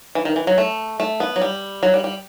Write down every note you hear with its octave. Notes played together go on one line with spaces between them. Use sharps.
E3
D#3
E3
F#3
A3
A3
B3
F#3
G3
F#3
G3
G3